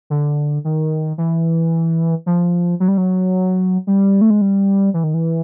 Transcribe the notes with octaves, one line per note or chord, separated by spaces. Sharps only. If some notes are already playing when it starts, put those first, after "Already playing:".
D3
D#3
E3
F3
F#3
G3
F#3
G3
A3
G#3
G3
E3
D#3
E3